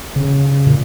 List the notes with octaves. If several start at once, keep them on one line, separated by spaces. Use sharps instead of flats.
C#3
A#2